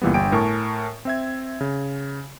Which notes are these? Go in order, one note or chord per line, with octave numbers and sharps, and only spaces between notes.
C#2 A#2 E3 G3 B3
G1 G2 G5 G#5 D7
A2 A#4 G#5 A5 C#6
C4 E5 G#6
C#3